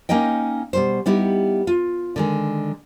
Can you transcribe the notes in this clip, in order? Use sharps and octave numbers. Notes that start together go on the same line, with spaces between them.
A#3 C#4 D#4 D#5 G5
B2 G3 C5
G3 B3 D#4 E4 G4
F4
D3 D#3 G#3